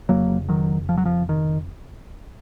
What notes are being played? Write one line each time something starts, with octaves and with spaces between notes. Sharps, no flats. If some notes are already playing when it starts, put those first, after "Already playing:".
F1 F2 C#3 F#3 A#3
D#3 F#3
F3
F#3
F3
D#3